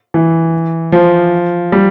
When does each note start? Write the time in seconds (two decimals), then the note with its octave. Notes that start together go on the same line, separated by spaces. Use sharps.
0.14 E3
0.92 F3
1.72 G3